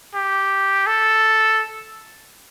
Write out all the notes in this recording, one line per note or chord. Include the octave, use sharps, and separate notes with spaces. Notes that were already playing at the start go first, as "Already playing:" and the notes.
G4
A4